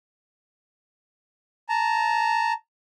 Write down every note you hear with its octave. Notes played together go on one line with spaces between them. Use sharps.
A5 A#5